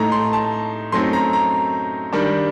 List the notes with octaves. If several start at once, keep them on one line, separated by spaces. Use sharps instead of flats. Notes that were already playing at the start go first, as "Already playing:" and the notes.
Already playing: A2 A3 D#4 A#5
C6
A5
F#2 F#3 A3 C4 D#4 C6
A#5
A#5
D#3 G3 D4